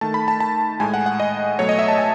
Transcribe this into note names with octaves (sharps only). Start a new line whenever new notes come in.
D#3 A3 A5
B5
A5
A5
A2 G#3 G#5
F#5
F#5
D#5
B2 F#3 A3 C#5
D#5
E5
A5
G#5